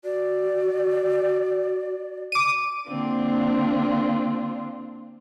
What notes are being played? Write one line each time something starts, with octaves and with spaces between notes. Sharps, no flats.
F#4 D5
D6 D#7
D3 A#3 C4 D4 F4